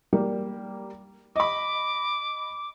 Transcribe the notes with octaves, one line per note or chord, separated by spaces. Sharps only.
G3 A#3
D#5 B5 D6